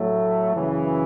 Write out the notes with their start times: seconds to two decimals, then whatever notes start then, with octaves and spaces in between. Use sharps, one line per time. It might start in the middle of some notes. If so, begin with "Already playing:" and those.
Already playing: A2 F#3 A3
0.52 F#2 C#3 E3